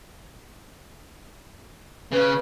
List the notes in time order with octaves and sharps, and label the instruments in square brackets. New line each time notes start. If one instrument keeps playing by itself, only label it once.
[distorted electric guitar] C#3 [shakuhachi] B4